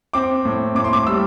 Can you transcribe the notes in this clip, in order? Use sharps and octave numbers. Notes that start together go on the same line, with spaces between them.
C4 D6
A2
A2 D6
C6
D6
G3 E6